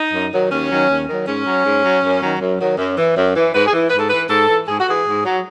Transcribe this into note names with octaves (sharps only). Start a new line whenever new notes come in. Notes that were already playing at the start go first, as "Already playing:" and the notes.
Already playing: D#4
F#2
D#3 F#3
D#2 C#4
D#3 F#3
D#2
D#3 F#3
G#2 C#4
F#3
G#2
F#3
F#2
D#3 F#3
F#2
D#3 F#3
F#2
E3
F#2
E3
G#2 B4
G#4
E3
G#2 B4
A4
E3 B4
G#2 A4
E3
G#2 G#4
F#4
E3 G#4
G#2
F#3